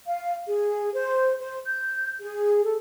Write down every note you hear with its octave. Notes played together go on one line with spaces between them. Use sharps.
F5
G#4
C5
C5
G6
G#4
A4